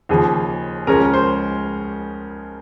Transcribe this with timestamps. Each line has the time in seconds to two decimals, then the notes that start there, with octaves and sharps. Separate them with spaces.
0.09 D#2 C#3 F3 G#4
0.87 C#2 C#3 F3 G#3 C#4 A#4
1.13 C5